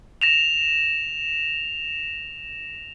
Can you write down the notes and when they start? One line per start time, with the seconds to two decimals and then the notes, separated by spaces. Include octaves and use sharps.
0.21 A#6 E7 F7